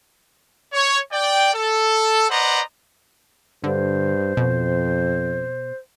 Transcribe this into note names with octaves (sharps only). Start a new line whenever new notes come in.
C#5
D5 G5
A4
B4 C5 D5 D#5 F#5 A#5
G2 D3 C5
F2 B2